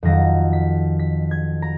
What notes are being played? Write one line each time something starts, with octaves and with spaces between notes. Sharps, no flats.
F2 D#3 F#3 A#6
B6
B6
G#6
A#5